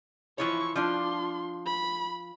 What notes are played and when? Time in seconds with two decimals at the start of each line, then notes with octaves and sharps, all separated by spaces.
0.38 E3 F3 E4 C#5 C#6
0.76 F3 D4 F4 C6
1.66 B5